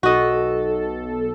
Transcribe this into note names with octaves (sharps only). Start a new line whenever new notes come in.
B1 F#4 A4 D#5